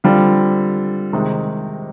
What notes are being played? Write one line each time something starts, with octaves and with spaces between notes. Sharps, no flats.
D3 G3 C4 F4
C3 D#3 G#3 D#4